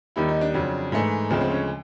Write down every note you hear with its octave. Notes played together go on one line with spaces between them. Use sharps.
D#2 D#3 G3 E4
D#4
D4
F2 C#3 F#3
G#2 E3 A3
D2 C#3 F3 G#3 C4
C4
C#4